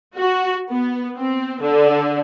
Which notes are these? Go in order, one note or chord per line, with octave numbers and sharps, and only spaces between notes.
F#4
B3
C4
D3